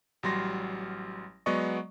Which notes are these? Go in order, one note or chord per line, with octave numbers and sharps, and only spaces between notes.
A1 F#3 G3 C6 A#6
F#3 G#3 B3 D5 D#5 C#6